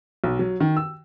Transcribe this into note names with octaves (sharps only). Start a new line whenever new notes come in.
B1
F#3
D#3
E6